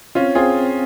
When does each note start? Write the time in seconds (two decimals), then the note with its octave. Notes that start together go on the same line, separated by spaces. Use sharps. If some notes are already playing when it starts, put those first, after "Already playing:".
0.15 C4 C#4 F4
0.35 C4 F4 G#4